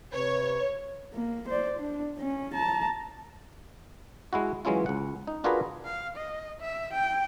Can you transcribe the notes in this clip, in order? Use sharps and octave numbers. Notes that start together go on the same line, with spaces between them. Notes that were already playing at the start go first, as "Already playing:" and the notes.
C3 B4 C#5
A#3
C5 D5
D4
C#4
A5 A#5
G#3 E4 F#4
E3 F#3 G#3 C#4 E4 F4
C#2 F#5
D#4
D4 F4 F#4 G#4 A#4 B4
F5
D#5
E5
G5